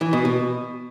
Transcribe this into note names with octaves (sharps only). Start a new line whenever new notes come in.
E3
B2
B2